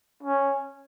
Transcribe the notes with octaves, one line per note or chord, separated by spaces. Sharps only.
C#4